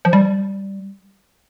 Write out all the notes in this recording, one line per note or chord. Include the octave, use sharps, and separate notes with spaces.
F3
G3